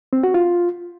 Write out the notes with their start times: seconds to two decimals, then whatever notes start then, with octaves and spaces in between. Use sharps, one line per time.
0.13 C4
0.23 F#4
0.34 F4